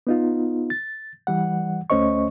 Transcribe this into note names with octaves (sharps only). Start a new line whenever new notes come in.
B3 D#4 F4
A6
E3 G3 F#5
D2 A3 C#4 C5 D#5 C#6